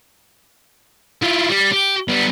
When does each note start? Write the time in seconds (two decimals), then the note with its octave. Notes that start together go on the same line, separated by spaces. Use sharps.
1.22 E4 F4
1.49 G3
1.73 G4
2.09 G3 B3